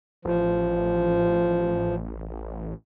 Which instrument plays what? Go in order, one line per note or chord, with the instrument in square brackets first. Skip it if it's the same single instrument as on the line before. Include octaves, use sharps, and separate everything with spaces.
[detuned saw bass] A1 [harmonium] F3